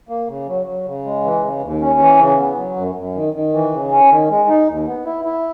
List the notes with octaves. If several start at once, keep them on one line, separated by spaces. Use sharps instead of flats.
A#3
C#3
F#3
F#3
C#3
G#3
E3
C#3
D#2
C#4
E3
C#3
B3
F#3
F#2
F#2
D#3
D#3
E3
C#3
C#4
D#3
G#3
D#4
D#2
B3
E4
E4